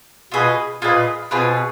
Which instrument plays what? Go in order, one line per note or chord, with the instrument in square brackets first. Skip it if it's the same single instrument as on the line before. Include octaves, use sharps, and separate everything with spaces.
[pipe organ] B2 [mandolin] F4 G#4 B4 D#5
[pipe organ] A#2 [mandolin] F4 G#4 B4 D#5
[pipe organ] B2 [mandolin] C4 F4 G#4 B4